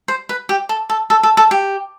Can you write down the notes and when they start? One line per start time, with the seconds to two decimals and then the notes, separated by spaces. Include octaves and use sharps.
0.08 C5
0.29 B4
0.49 G4
0.69 A4
0.90 A4
1.10 A4
1.23 A4
1.37 A4
1.51 G4